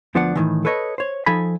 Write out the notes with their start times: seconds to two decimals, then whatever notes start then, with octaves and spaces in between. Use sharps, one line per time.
0.15 D2 F3 B3 D4 D5 F#5
0.36 A2 D#3 E3
0.65 A4 B4 C#5 D#5
0.98 C5 C#5
1.26 F3 D#4 A4 G#5 B5